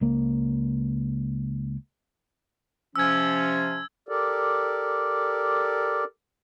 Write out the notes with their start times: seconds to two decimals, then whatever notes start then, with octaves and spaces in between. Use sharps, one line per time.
0.01 C#2 A#3
2.96 C3 F3 C#4 E6 G#6
4.09 G4 A4 A#4 D5